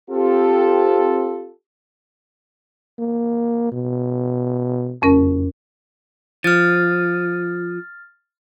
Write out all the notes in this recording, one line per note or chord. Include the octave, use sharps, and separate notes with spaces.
C4 F4 G4 A4
A#3
B2
F#1 F2 C#4 A#4
F3 F6 A6